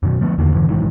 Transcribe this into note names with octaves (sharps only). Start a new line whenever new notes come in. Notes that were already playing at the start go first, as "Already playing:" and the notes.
F#2 B2 D#3
F3 A3 B3
E2 D3 D#3 A#3
G2 D3 E3
B1 G#2 D#3 E3